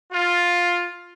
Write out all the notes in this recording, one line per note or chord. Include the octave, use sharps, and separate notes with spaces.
F4